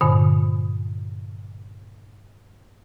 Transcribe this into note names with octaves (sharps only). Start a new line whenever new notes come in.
G2 A#2 D3